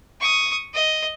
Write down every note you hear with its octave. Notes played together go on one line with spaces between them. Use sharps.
C#6 D#6
D#5